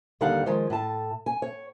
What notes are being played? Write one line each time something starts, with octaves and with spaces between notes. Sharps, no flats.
D#2 D3 G3 D#4 F5 F#5
D#3 F3 G#3
A2 A5
G#5
C#5